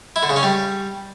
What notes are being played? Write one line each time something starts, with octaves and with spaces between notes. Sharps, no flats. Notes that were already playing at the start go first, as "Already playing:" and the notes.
E4
D3
C#3
C#4
G3